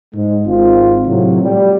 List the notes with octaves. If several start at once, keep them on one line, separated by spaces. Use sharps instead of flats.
G#2 G#3
G#1 C4 F4
A2 C3 F#3
G3